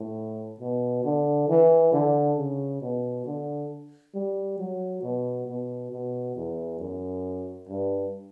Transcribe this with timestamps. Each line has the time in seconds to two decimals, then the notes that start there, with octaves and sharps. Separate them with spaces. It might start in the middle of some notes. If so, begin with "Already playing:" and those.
Already playing: A2
0.60 B2
1.04 D3
1.49 E3
1.93 D3
2.38 C#3
2.82 B2
3.26 D3
4.14 G3
4.59 F#3
5.03 B2
5.47 B2
5.92 B2
6.36 E2
6.80 F#2
7.68 G2